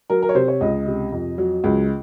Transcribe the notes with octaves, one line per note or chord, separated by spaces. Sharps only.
F#3 A#4
A#4
C#5
C3 C5
C#5
C#2 D#5
C3
F2
F#3
C#2